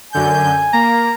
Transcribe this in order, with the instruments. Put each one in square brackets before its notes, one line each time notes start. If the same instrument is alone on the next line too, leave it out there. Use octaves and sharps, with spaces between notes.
[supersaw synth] F#2 D3 G6 [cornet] G#5
[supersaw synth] A#3 [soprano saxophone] A#5